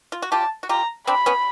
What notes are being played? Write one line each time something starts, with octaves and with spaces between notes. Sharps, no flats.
F4
F#4
F4 G4 A5
F#4
F4 G4 A#5
C4 D4 B5
B3 C#4